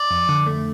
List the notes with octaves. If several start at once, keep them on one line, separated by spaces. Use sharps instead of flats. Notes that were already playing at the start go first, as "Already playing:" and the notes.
Already playing: D5
F2
D3
A3